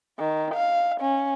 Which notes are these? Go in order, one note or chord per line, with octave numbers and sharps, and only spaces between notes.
D#3
F5
C#4